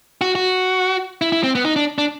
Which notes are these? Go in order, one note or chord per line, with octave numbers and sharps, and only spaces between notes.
F#4
F#4
E4
E4
C4
B3
D#4
D4
D4